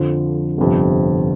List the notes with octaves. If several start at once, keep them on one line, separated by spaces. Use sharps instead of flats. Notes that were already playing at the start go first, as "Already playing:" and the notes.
Already playing: F2 D3 F3
G1 F2 C3